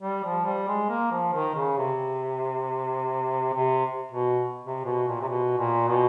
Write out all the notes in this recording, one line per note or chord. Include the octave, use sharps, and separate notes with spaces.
G3
F3
G3
G#3
A#3
F3
D#3
C#3
C3
C3
B2
C3
B2
A#2
C3
B2
A#2
B2